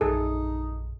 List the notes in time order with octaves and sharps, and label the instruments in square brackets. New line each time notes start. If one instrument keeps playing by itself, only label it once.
[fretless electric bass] A#1 F#2 [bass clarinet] D#4 [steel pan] G#4 A4